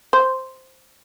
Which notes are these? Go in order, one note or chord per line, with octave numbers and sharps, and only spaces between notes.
C5